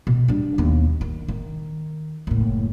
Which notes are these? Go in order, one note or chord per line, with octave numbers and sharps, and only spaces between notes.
B2
G3 D4
D#2 B3
D#3
D#3
F#1 A2